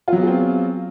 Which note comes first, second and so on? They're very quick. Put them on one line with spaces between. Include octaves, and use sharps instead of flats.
F4 F#3 B3 G#4 C4